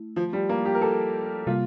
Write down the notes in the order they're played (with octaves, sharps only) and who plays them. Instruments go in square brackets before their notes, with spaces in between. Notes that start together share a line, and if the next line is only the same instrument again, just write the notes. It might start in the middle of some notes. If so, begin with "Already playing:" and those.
Already playing: [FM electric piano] A3 E4
[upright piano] F3
G3
A#3
G4
A#4
A4
[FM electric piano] C3 G3 A#3 [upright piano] F4